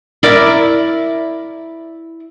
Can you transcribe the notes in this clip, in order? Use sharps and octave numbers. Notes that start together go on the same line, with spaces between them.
E4 A#4 D5